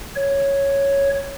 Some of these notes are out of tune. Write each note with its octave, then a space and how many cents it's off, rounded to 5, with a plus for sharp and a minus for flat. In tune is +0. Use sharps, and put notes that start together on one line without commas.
C#5 +0